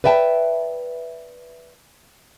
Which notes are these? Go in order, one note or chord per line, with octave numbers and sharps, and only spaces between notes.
B4 D5 E5 G5 A5